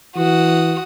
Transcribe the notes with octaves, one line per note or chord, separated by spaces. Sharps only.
E3 F#4 D#6